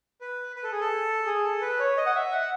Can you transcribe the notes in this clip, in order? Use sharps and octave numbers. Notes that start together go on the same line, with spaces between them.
B4
B4
A4
G#4
A4
G#4
A4
B4
C#5
D#5
F#5
E5
F#5